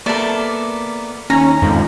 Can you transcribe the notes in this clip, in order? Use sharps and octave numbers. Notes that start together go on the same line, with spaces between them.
A#3 B3 A4 D5 E5
D#2 C#4 A#5
F2 G#2 D#3 F3